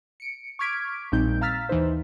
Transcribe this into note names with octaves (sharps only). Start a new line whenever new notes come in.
C#7 D7
C#6 D6 F6 G#6 B6 D7
A#1 A#2 G3 C4 D#4 G6
F5 A#5 E6 F6 A6 B6
D#2 E3 D#4 C5